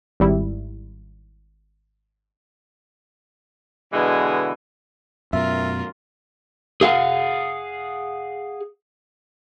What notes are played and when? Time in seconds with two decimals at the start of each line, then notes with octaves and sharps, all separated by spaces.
0.20 G#1 G3 E4
3.93 B2 D3 E3 G#3
5.33 F#2 B2 F4 A#4 E5
6.81 G#4 F5 F#5